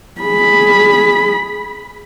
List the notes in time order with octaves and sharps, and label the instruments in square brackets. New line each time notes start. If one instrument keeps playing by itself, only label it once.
[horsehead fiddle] G#4 B5